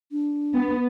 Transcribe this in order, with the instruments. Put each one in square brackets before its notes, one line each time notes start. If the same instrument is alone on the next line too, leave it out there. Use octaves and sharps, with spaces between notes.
[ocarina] D4
[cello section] B3